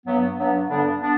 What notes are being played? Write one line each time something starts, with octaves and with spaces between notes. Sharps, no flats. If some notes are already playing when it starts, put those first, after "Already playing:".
G2 F#3 B3
G2 F#3 B3
G2 D3 G3 B3 D4
B3 D4